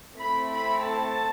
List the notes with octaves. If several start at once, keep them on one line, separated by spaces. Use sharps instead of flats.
A3 C4 E4 B5
B5
A5